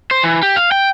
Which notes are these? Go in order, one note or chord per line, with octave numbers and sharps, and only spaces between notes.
C5
E3
G4
F5
G5